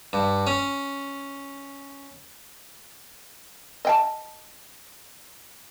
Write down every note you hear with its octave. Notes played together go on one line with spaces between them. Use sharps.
G2
C#4
D#5 G5 A5